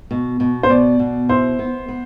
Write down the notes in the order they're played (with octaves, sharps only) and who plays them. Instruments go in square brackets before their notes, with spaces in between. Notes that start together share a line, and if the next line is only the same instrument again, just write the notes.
[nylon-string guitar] B2
B2
[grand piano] C5
[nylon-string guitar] B2 [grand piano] D5
[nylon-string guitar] B2
[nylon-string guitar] E4 [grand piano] C5
[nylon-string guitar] B3
B3